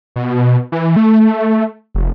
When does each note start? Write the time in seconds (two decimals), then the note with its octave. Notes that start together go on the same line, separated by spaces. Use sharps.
0.16 B2
0.72 E3
0.96 A3
1.95 F1